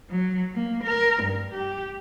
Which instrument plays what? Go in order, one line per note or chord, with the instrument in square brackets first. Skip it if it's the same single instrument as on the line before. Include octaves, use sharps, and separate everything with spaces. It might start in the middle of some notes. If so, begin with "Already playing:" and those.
[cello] F#3
A#3
A#4
G2
G4